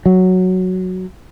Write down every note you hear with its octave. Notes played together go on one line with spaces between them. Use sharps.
F#3